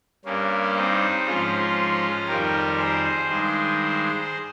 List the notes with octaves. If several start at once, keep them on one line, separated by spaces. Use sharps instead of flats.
G2 G3 A#3 C#4
C4 D#4
G#2 F3 G#3 C#4 F4
F2 D#3 G3 G4 A#4
G#4 C5
G2 D#3 G#3